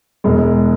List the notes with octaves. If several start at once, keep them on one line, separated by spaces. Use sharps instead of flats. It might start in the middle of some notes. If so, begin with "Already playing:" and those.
E1 G#3